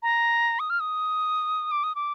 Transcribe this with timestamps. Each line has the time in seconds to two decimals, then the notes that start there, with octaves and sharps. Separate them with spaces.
0.03 A#5
0.60 D#6
0.70 F6
0.80 D#6
1.71 D6
1.84 D#6
1.95 D6